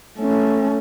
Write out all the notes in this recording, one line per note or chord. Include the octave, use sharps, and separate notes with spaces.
A3 C#4